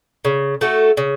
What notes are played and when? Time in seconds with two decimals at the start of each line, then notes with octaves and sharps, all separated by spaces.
0.25 C#3
0.61 A3 F#4 A4
0.97 C#3